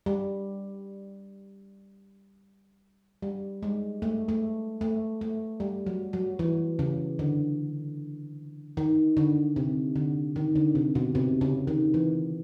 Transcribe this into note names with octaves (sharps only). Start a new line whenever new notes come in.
G3
G3
G#3
A3
A3
A3
A3
G3
F#3
F#3
E3
C#3
D3
D#3
D3
C3
D3
D#3
D3
C3
B2
C3
C#3
D#3
E3